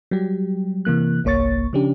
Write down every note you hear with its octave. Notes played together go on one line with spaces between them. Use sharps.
F#3 G3 G4
C3 E3 A#3 F#6
G1 C2 A#3 C#5 C#6 A6
C#3 F3 C#4 D4 G4